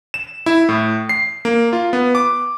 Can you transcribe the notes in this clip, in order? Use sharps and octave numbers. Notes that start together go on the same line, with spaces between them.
E7
E4
A2
C7
A#3
F4
B3
D6